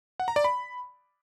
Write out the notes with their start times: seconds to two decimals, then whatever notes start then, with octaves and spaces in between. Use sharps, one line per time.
0.20 F#5
0.28 A#5
0.36 D5
0.44 B5